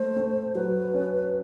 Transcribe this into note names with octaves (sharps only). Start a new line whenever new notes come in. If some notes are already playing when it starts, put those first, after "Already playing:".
Already playing: A3 C5
A3
F#3 B4
C#4